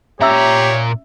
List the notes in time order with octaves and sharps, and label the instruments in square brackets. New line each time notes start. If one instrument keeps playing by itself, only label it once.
[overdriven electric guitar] A#2 A#5 [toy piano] C#4 E5 E6 [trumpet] G4 [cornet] C#5